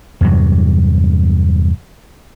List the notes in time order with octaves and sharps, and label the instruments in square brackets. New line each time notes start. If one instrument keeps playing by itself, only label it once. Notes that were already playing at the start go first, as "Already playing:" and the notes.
[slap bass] E2 G2 C3 F#3